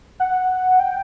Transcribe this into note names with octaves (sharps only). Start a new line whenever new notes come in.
F#5
G5